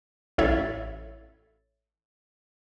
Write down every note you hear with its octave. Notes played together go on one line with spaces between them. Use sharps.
A1 E4 A4 C#5 E5 A6